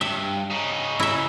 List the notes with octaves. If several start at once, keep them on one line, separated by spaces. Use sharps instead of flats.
G2 E5
C#3 D#4
E4 E5